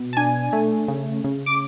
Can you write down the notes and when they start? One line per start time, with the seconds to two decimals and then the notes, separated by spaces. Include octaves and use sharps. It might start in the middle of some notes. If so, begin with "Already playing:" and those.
Already playing: B2
0.13 A5
0.17 D4 G#5
0.53 A3
0.88 C#3
1.24 C#3
1.46 D6